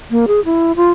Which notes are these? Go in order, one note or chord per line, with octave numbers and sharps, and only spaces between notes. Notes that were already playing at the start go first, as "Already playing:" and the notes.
A#3
G#4
E4
F4